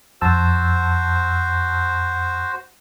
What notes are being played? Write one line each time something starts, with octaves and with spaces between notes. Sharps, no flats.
F2 F#4 C5 A5 E6